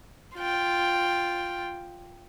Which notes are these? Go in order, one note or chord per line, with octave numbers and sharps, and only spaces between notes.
F4 G5